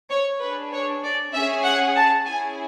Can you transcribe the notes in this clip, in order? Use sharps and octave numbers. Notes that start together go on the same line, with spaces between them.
C#5
D4 G#4 B4
C#5
D5
C#4 G#4 E5
F#5
A5
C#4 E4 G#4 G#5